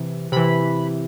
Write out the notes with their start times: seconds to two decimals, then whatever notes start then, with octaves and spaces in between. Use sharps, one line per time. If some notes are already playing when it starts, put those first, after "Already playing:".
Already playing: C3 E3
0.32 C3 E3 B5